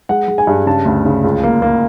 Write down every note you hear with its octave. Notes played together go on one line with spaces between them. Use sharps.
G#3 F#5
G#3
G#5
G2
C#3 A5
D2
C#3
C#2
A#3
A#3